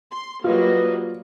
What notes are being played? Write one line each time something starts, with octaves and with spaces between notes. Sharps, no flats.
C6
F#3 G3 A#3 F4 B4 D#5